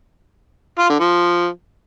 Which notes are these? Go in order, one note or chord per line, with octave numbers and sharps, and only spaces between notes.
F4
D3
F3